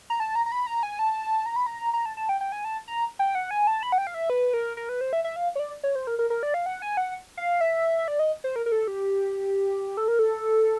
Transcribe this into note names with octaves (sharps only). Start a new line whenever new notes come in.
A#5
A5
A#5
A#5
B5
A#5
G#5
A5
A#5
B5
A#5
A#5
A5
A5
G5
G5
G#5
A5
A#5
G5
F#5
G#5
A5
B5
F#5
G5
F5
E5
B4
A#4
A#4
B4
C5
E5
E5
F5
C#5
D5
C#5
C5
A#4
A#4
A#4
D5
F5
F#5
G#5
F#5
F5
E5
D5
D#5
C5
A#4
A#4
A4
G4
A4
A#4
A4